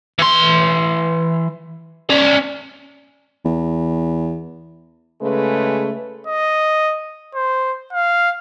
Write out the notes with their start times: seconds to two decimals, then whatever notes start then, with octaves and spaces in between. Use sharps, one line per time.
0.19 E3 C6
2.10 C#4 D5
3.45 E2
5.22 C#3 G#3 A3 B4
6.27 D#5
7.35 C5
7.93 F5